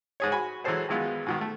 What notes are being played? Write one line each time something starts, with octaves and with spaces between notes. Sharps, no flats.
G#2 G#4 C#5
F#4 G#5 B5
E3 F#3 G#3 A4 C5 C#5
F#2 D#3 E3 G#3 B3 F4
G#2 B2 D#3
A3